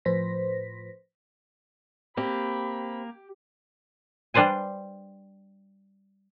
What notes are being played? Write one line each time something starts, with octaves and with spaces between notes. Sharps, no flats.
A2 F3 B4 C5 A#6 B6
A#3 C4 G4 B5
G3 D4 B4 C5 G#5